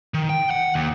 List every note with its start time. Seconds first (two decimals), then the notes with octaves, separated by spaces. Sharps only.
0.14 D#3
0.29 G5
0.51 F#5
0.75 D#2